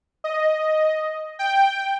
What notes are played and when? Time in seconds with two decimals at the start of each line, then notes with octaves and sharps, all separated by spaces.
0.24 D#5
1.39 G5